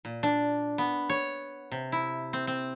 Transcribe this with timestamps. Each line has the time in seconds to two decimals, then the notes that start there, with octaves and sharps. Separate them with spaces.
0.05 A#2
0.23 D4
0.78 B3
1.09 C#5
1.72 C3
1.92 E4
2.33 C4
2.47 C4